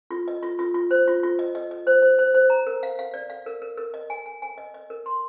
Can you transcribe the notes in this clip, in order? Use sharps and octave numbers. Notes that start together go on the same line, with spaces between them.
F4
D#5
F4
F4
F4
C5
F4
F4
D#5
D#5
D#5
C5
C5
C5
C5
A#5
A#4
F5
F5
D5
F5
A#4
A#4
A#4
D#5
G#5
G#5
G#5
D#5
D#5
A#4
C6